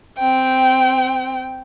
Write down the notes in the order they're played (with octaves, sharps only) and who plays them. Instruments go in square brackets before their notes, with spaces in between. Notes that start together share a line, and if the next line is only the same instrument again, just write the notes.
[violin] C4 G5